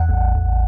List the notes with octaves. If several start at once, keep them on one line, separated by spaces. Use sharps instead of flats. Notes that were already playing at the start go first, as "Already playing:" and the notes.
Already playing: E2 F#5
A1
A1